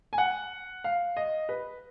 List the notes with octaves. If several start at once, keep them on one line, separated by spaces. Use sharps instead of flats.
G#5
F#5
F5
D#5
B4